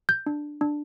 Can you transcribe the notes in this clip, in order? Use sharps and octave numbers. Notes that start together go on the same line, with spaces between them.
G6
D4
D4